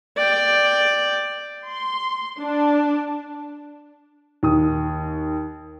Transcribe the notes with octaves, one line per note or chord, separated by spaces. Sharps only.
D5 G5
C6
D4
D#2 D#6